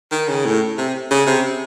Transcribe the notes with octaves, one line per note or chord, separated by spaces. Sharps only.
D#3
C#3
A2
C3
C#3
C3